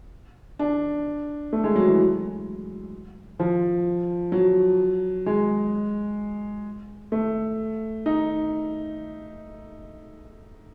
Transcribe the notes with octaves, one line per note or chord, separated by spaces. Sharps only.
D4
A3
G#3
F#3
E3
F3
F#3
G#3
A3
D#4